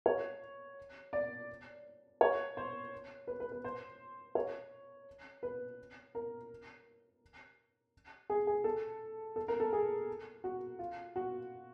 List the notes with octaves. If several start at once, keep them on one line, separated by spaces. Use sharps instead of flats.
C#5
D5
C#5
C5
B4
B4
B4
C5
C#5
B4
A#4
G#4
G#4
A4
A4
A#4
A4
G#4
F#4
F4
F#4